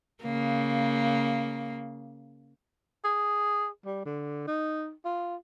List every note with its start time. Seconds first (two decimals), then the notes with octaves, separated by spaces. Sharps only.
0.23 C#3 A#3
3.05 G#4
3.86 G3
4.06 D3
4.47 D#4
5.05 F4